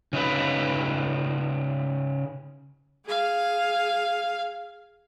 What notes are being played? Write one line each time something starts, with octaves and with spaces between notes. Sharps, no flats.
C#3 D#4 B4
G#4 F5